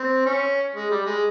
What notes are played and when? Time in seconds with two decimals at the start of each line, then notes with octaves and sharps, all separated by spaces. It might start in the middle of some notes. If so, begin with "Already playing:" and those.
Already playing: C4
0.26 C#4
0.74 G#3
0.91 G3
1.06 G#3